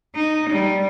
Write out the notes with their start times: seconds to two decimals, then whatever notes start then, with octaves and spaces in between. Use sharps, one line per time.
0.15 D#4
0.50 G3